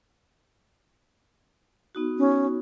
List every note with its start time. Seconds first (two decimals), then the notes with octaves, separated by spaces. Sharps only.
1.95 B3 D#4 F#4
2.18 C#4